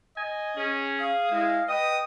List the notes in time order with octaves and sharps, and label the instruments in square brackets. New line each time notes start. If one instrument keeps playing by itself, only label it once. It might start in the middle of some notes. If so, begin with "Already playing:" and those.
[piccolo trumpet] D#5 [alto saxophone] G#5
[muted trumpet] C#4 [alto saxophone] G#4
[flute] F5 [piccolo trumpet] D#6
[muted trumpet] G#3 [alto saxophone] E4
[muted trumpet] B4 [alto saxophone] D#5 [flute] G5 [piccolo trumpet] D#6